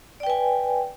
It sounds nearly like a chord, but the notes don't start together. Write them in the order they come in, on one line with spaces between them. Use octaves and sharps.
D5 G5 B4 G#5